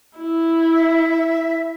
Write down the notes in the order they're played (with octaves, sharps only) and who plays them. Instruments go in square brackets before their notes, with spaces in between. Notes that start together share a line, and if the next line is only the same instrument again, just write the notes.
[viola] E4
[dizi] E5